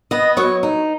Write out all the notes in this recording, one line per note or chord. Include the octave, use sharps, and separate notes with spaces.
B3 D#5
F#3 C#5
D#4